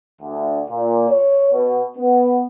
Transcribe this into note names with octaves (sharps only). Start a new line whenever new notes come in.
D2
A#2
C#5
B2
B3